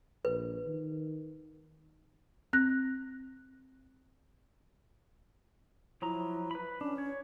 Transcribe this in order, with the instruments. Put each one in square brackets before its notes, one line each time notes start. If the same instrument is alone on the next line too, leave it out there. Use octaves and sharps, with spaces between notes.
[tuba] A#1 [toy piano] B4
[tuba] D#3
[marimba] C4 F#6 A#6
[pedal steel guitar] F3 F#3 A#5 [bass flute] E4
[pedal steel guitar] B4 B5
[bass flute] C#4 [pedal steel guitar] D4
[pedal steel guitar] C#5